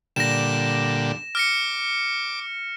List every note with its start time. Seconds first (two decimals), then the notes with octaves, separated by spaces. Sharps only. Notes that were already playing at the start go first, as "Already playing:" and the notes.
0.16 A#2 D3 G3 A#6 E7
1.35 D6 F6 A#6 C#7